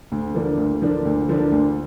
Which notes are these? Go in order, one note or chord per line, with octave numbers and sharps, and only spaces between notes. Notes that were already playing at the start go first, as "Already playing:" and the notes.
D2
D3 F3 A#3 D4
D2
D3 F3 A#3 D4
D2
D3 F3 A#3 D4
D2